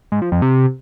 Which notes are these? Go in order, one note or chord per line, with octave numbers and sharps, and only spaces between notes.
G#2
F3
F2
C3